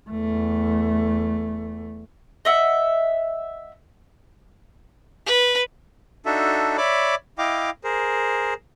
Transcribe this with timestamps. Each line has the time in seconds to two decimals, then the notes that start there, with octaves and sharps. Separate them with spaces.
0.10 E2 A3
2.45 D#5 E5 F#5
5.26 B4
6.26 D4 D#4 F#4 A4 E5
6.77 C#5 D5 E5 B5 D6
7.38 E4 D#5 F5 G5 D6
7.84 G#4 A#4 C5